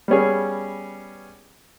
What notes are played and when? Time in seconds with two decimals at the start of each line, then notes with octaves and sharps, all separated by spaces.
0.08 G3 B3 C#4 G#4